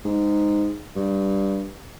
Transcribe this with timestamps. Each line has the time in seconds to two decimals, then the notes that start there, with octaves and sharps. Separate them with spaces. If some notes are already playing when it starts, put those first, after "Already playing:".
0.05 G#2
0.96 G2